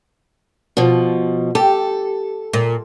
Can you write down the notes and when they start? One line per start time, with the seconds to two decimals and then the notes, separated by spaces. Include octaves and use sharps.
0.77 B2 F3
1.55 G4 A4
2.53 A#2